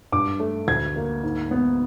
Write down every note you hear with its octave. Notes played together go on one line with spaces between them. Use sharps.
G2 D6
A3
D2 G#6
A#3
G#2
B3